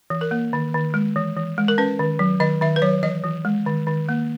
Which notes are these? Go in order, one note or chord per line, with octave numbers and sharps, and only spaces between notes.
E3
A#4
A#3
D#3
D#3
G#3
E3
E3
G#3
A#4
C#4 B4
D#3
F#3
D#3 D#5
D#3 E5
B4
F#3 C#5
E3 D#5
E3
G#3
D#3
D#3
A#3